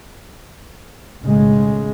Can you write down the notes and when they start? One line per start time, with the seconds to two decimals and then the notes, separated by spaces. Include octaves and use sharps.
1.21 B1 A2 C#3 G#3